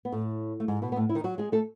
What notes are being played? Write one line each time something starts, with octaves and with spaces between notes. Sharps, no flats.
B3
A2 A3
A3
G#2 G#3
B2 B3
B3
A2 A3
E4
D#3 D#4
F#3 F#4
G#3 G#4
A3 A4